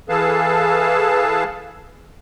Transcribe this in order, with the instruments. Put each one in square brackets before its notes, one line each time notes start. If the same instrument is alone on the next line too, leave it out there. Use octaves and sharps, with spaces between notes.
[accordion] E3 G#4 A4 B4 F5 A5